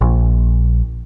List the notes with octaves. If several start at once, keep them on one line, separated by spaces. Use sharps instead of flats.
A#1